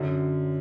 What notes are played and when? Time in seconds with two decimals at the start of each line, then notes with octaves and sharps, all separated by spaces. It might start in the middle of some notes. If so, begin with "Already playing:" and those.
Already playing: F#2 D3 F#3